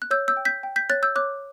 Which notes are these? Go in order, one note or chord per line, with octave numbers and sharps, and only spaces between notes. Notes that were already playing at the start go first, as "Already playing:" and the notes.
F#6
C#5 E6 G6
E6 G6
G5
G6 B6
G5
G6 B6
C#5 F#6 A6
E6 G6
C#5 D6 F#6